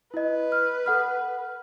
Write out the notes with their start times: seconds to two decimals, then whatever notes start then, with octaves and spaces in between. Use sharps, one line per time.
0.14 E4 B4 D#5
0.52 F6
0.86 A4 F#5 F6